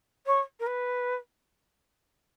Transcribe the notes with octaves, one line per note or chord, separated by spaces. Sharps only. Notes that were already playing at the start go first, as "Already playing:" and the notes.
C#5
A#4
B4